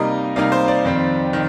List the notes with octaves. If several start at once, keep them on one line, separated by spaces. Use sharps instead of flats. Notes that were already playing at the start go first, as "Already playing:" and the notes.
Already playing: C3 G3 A#3 D#4 D#5
C3 G3 A#3 D#4 F5
C5
D5
F2 D#3 G3 C4
D#3